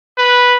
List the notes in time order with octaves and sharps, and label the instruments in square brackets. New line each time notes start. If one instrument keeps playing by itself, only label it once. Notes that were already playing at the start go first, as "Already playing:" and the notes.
[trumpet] B4